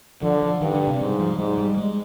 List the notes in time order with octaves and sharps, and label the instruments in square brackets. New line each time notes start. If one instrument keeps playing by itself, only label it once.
[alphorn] D3 [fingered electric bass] F3
[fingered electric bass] F3
[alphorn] G2 [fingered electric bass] D#3
[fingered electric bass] D3
C3
[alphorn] G#2 [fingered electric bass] G3
[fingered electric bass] F3
[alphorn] G#2 [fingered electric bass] G3
[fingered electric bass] G3
G#3